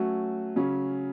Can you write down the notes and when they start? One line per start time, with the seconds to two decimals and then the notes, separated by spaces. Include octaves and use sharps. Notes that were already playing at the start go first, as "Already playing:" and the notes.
Already playing: F#3 A3 C#4 F#4
0.56 C#3 F#3 C#4